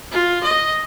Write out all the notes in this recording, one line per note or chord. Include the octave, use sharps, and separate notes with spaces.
F4
D#5